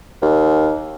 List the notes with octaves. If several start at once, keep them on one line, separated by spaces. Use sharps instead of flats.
D#2